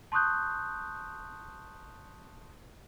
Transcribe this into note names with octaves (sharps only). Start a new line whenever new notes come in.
A5 C6 C#6 D#6 F#6 G6